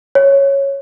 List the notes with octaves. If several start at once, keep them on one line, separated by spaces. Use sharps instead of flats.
C#5